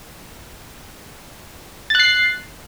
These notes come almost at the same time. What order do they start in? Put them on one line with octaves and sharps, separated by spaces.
A6 F#6 C7